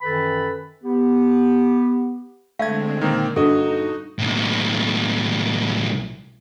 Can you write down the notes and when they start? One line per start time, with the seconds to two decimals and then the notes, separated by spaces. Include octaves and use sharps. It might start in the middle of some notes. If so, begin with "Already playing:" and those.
0.02 F#2 D#3 E3 A4 B4 B5
0.84 B3 G4
2.59 D3 G#3 A3 C4 E5 F5 G#6
3.01 A#2 D#3 A#3 C4
3.36 G2 D#4 F#4 A4 D#5
4.19 B1 A2